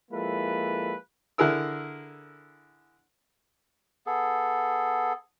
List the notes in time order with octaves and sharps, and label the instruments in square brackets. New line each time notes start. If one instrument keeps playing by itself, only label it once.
[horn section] F3 G#3 A#3 E4 A4 B4
[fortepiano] D3 E4 G#4 A#4 E6
[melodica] B3 G#4 A4